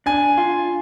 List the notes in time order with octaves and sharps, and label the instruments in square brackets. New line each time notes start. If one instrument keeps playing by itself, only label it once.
[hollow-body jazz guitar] D4 [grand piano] G#5
[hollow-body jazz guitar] F4